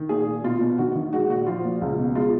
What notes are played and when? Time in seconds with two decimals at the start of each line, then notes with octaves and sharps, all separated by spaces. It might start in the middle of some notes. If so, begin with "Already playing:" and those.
Already playing: D#3
0.09 A#2 G#4
0.27 A#2
0.44 B2 F4
0.61 B2
0.78 D#3 F#4
0.95 D#3
1.13 G#3 F#4
1.30 A#2 F#4
1.47 F3 F4
1.65 A#2
1.82 C#2
1.99 B2
2.15 G#3 F4